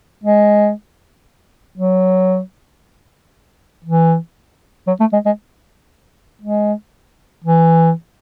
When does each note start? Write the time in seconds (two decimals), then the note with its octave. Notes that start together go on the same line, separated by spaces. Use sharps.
0.23 G#3
1.78 F#3
3.84 E3
4.87 F#3
5.00 A3
5.13 G#3
5.26 G#3
6.42 G#3
7.44 E3